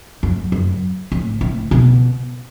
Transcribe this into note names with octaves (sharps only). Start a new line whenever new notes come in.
F#2
F#2
A2
A2
B2